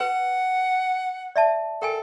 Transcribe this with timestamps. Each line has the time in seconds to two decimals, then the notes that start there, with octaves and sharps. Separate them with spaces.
0.01 B4 F#5
1.36 D5 E5 A5
1.82 A4 A#4 G5 G#5